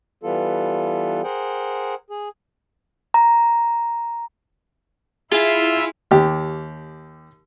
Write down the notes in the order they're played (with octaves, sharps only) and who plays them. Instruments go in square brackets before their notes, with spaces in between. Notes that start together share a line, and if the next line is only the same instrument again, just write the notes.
[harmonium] E3 G3 B3 F4 A4
G#4 A#4 C5 F#5 G5
G#4
[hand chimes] A#5
[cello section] E4 [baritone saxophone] F4 [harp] G#4 [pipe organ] E5
[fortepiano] D#2 G4